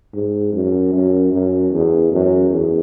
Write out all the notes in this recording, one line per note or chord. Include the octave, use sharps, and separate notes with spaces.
G#2
F#2
F#2
F#2
E2
F#2
E2